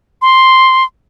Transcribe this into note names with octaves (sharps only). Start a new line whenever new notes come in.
C6